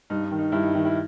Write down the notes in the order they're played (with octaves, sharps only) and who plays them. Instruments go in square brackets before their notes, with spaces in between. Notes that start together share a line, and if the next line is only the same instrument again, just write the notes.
[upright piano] G2 D#4
D#4
D#3
D#4
G2 E4
D#4
D#3 E4
E4